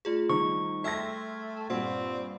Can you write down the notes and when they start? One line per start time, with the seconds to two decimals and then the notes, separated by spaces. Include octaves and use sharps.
0.05 A3 F4 G#4
0.30 D#3 G3 C#6
0.84 A3 E5 G5 C6 F6 G#6 A#6
1.70 G2 A#2 C4 F#5